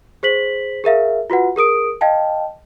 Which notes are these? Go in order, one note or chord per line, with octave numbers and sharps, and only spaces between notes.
G#4 C5 B6 F#7
G#4 A#4 E5 F5
F4 F#4 B4 F#5
G#4 A#4 D#6 D7
D#5 F5 G5 A5